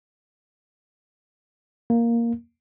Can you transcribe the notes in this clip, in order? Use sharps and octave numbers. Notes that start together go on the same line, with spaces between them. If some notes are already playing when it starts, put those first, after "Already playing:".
A#3